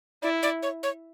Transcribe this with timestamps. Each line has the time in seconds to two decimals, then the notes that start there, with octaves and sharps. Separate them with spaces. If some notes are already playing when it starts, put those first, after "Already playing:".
0.22 E4 D5
0.43 D5
0.62 C#5
0.83 C#5